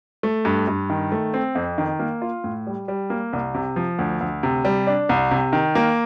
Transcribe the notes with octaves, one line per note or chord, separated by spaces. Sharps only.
A3
G2
G2
D#3
A3
C4
F2
D#3
A#3
F4
A2
G3
G3
A#3
C2
C3
F3
D2
D2
C3
G3
D4
C2
C3
D#3
A#3